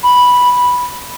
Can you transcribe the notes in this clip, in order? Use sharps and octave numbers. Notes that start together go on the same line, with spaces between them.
B5